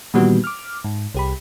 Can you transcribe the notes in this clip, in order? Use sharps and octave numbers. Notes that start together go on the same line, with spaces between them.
A#2 D#3 E3 G3 B3 F#4
D6 F6
G#2
C2 G4 B5